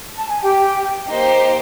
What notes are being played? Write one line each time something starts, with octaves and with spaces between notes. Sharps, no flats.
A5
G#5
G4 G5
A#3 D#4 G4 C5